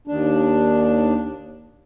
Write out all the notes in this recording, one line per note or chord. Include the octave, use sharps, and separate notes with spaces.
D#2 D4